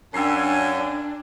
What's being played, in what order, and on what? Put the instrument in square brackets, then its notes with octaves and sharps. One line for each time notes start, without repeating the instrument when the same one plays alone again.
[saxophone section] F#2 [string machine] D4 [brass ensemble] F5 G#5 [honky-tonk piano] G5 E6 C7